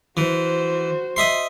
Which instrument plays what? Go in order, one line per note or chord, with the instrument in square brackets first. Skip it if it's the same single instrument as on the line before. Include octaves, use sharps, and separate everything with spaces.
[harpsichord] E3 [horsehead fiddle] F#4 C5
[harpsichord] D#5 E5 C6